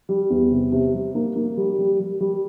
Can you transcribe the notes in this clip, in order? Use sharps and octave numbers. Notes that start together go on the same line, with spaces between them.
G3
E2
C3
C3
G3
A#3
A#3
G3
G3
G3
G3